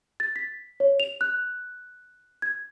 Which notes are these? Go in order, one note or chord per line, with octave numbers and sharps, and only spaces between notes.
A6
B6
C#5
F7
F#6
G#6